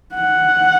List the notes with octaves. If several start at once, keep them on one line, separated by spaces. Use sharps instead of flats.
F#5